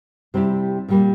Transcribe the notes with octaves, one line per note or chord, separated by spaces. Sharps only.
C3 G3 C4 E4 G4
A#2 G3 A#3